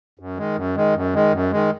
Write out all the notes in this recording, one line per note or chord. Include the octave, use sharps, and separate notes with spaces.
F#2
D#3 G#3
F#2
D#3 G#3
F#2
D#3 G#3
F#2
D#3 G#3